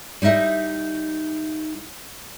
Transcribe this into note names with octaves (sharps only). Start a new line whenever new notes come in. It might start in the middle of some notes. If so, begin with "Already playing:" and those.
G3 D#4 D#5 E5